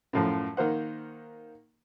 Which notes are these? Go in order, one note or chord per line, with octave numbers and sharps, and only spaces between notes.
F#2 A2 F3
D#3 A#3 C5 F#5